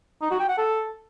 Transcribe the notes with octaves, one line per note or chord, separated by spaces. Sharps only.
D#4
F#4
G5
F#5
A4